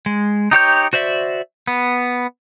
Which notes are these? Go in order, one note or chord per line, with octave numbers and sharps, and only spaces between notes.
G#3
D#4 G4 C#5 G6
F#4 C5 D5 E5
B3